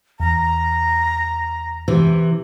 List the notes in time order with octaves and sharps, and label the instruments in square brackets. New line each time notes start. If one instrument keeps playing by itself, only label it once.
[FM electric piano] E2 [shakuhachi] A#5
[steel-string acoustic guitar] C3 E3